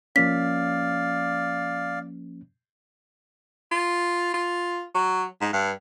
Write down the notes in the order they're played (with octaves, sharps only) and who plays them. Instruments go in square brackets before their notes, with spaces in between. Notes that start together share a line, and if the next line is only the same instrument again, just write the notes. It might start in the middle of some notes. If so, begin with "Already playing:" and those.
[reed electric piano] F3 A#3 C#4 [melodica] D5 F5 [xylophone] B6
[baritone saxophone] F4
F4
F#3
G#2
G2